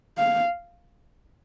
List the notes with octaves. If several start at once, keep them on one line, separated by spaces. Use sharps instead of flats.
F5